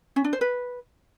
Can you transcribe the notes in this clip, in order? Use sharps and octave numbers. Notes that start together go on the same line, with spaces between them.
C#4
D4
C5
B4